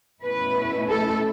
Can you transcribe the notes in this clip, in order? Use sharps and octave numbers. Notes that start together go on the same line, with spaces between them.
B2 A3 C#4 E4 B4
A4